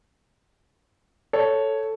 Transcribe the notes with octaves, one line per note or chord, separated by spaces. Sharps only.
A4 C#5